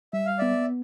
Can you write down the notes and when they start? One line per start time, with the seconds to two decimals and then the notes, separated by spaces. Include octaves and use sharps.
0.13 G3 E5
0.26 F5
0.38 B3 D5 E5